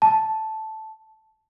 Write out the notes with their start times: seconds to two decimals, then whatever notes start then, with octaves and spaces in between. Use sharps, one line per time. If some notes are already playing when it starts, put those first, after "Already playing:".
0.02 A5